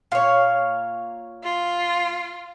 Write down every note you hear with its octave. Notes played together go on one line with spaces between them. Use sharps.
A#2 C#5 F5
F4